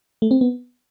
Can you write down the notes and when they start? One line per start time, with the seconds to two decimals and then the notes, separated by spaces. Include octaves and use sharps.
0.22 A3
0.31 C4
0.41 B3